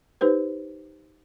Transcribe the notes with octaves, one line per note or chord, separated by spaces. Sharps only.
D#4 G4 B4 C5